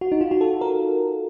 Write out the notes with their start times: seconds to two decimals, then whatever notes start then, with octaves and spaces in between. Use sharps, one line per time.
0.01 F#4
0.12 D#4
0.21 F4
0.31 F#4
0.41 A4
0.61 A#4